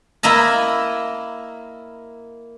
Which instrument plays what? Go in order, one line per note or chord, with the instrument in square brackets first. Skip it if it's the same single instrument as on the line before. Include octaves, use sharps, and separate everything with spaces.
[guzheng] A#3 E4 D#5 A5